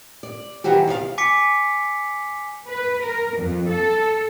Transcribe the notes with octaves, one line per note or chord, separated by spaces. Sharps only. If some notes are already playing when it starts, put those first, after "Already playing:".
D5
D#3 E3 F#3 F#4 G4
C3 D4 D5 F5
G#5 D6 B6 C#7
B4
A#4
F2
A4